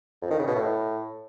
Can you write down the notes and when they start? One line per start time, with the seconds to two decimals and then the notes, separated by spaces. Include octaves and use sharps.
0.22 F2
0.30 D#3
0.39 C#3
0.47 B2
0.56 A2